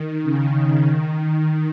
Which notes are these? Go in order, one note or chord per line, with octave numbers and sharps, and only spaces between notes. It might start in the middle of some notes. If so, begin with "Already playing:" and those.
Already playing: D#3
C#3
D#3